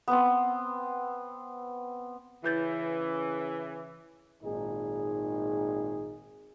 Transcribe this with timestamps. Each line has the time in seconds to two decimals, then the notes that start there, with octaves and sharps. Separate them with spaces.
0.08 B3 C4
2.45 C#3 E3 E4 G6 A6
4.42 G#1 A#2 D#3 D#4 G#4